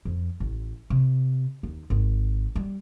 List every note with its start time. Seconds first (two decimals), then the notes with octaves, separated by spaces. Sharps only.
0.05 F2
0.40 A1
0.90 C3
1.63 D#2
1.90 G#1
2.56 G3